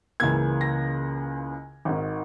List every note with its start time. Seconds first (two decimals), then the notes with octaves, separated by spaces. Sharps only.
0.20 C#2 C#3 E3 A#3 G#6
0.61 A#6
1.85 G#1 G#2 D#3